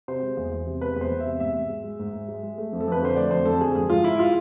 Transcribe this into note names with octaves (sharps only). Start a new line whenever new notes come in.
C3 C5
G#3
E2
E2
C3
G#3 B4
E2
C5
E2
C3 E5
G#2 E5
G#2
G#3
G#3
G#2
G#2
G#3
G#3
A3
F2
A4
F2 B4
D3 C5
A3 D5
F2 C5
F2 A4
D3 G#4
G#2 G#4
G#2 F4
G#3 E4
G#3 F4